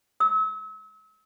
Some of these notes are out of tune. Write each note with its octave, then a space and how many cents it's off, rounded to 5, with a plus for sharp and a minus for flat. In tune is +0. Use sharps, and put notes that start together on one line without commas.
E6 -40